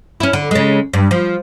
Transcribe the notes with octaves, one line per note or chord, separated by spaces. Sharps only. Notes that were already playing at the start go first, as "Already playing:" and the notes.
C#4 E4
D3
C#3 G#3
G2
F3